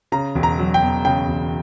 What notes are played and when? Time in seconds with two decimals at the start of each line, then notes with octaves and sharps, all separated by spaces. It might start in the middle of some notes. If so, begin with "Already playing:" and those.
0.12 C#3 A#5
0.35 E1
0.43 A#5
0.59 F#3
0.74 G5
0.82 E2
1.05 C#3 G5
1.28 E1